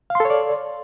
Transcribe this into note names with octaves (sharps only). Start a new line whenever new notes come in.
A4 C#5 D5 F5 C6